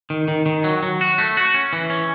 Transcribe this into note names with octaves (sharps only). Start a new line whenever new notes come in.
D#3
D#3
D#3
F#3
F#3
F#4
A3
F#4
C#4
E3
C#4